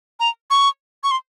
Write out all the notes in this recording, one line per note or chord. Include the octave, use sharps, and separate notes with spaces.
A#5
C#6
C#6
C6